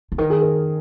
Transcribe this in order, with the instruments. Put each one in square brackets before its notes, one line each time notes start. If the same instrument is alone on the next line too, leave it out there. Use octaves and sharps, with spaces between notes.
[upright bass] C#3
[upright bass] D#3 [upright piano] A#4
[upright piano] G#4
A#4